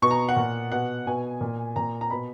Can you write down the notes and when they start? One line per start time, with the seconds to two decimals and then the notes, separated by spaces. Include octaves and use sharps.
0.02 B2 C#6
0.11 A#5
0.29 F#5
0.36 A#2
0.72 B2 F#5
1.07 B2 G#5
1.41 A#2
1.76 A#2 A#5
2.01 A#5
2.10 B2 B5